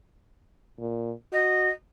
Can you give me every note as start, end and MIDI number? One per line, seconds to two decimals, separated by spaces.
0.79 1.12 46
1.32 1.70 66
1.32 1.70 75